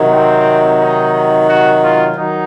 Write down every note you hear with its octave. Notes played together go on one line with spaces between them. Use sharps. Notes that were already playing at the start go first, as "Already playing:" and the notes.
Already playing: C3 D#3 F#3
C4
D#4
F#4
F4
D#3 F#3 D#4